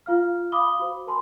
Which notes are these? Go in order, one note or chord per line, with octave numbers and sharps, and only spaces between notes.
F4 F5 F6
F5 B5 D6 D#6 G7
F#4 C5
A#4 G#5 A5 B5 C6